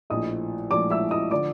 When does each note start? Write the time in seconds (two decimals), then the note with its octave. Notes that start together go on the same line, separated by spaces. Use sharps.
0.10 A#1 A2 F3 D#5 D#6
0.71 A#1 A2 F3 D5 D6
0.90 E5 E6
1.11 D#5 D#6
1.31 D3 F3 D5 D6